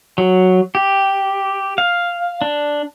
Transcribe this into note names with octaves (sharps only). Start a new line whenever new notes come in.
F#3
G4
F5
D4